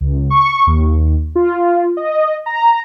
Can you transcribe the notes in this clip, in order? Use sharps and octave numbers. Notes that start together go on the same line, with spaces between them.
C#2
C#6
D#2
F4
D#5
A#5